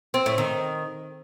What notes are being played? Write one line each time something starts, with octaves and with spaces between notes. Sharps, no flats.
C4
A2
D#3